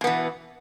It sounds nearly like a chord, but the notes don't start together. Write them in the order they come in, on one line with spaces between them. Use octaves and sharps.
B2 B3 E3